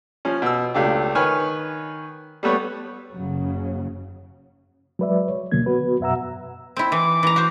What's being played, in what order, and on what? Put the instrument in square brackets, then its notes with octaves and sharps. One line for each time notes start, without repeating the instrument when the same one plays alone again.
[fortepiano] F3 C#4
B2 E6
C#2 A3 D4 G4
D#3 B4 C#5 G#5 F6
G3 A3 B3 C#5
[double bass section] F#1 C#3 F#3
[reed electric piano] F#3 G#3 B4 D5 E5
C#5
C#2 B2 D3 F#3 A#3 G#6
B3 F#4 B4
F#2 B2 E5 F#5 A#5 E6
[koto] C4 E4
[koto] E3 [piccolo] D6
[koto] E3 A#5
F#4 C5